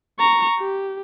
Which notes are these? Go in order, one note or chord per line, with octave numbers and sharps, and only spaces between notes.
A#5 C#6
G4